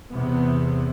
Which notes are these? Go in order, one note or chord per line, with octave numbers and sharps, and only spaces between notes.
E2 C3 B3